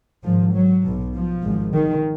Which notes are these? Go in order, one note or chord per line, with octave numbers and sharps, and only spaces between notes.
G#1 G#2 F3
F#3
B1 B2
F3
G#1 G#2
D#3